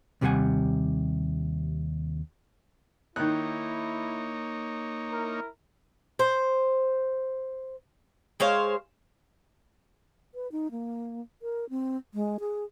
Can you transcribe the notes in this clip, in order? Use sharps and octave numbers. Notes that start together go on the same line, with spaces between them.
D#2 C3 G3 A4 F#5 G#5
D#3 A#3 D#4 E4 C#5 F#6
E4 A#4
C5
G#3 C5 C#5 F5
B4
D#4
A#3
A#4
C4
G#3
G#4